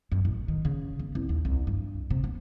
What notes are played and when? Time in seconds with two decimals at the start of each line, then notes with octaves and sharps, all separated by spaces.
0.12 F#2
0.25 A1
0.48 D#3
0.65 C#3
0.99 B3
1.15 C2
1.29 D#2
1.45 C2
1.67 G2
2.10 C3
2.24 B3